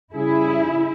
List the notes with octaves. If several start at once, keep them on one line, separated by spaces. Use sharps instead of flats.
C#3 G3 E4 G#4